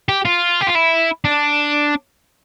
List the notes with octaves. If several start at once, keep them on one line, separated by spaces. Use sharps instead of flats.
G4
F4
G4
F4
E4
D4